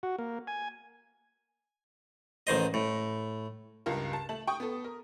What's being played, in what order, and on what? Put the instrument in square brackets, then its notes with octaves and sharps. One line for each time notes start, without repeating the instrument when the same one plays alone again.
[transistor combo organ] F#4
A#3
G#5
[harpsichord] A1 D#3 C5 D#5
A2
[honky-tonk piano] C#2 G2 F4 A#4
A5
A3 A5 F#7
G5 C#6 D#6
B3 A4
A#4